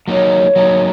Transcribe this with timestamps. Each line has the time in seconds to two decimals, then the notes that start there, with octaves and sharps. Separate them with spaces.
0.08 F#3 A#3 D#4 C#5
0.56 F#3 A#3 D#4